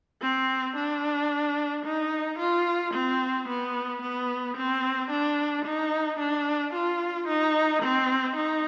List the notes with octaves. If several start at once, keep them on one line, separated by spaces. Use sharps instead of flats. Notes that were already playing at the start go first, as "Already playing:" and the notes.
C4
D4
D#4
F4
C4
B3
B3
C4
D4
D#4
D4
F4
D#4
C4
D#4